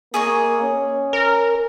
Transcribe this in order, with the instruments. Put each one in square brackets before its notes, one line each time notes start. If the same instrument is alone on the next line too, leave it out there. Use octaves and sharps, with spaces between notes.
[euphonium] A#3 [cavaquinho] G#4 C#5 D#5
[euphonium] C#4
[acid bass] A#4